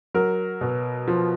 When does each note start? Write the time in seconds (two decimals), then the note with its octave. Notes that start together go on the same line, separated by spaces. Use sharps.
0.14 F#3 A#4
0.61 B2
1.08 F3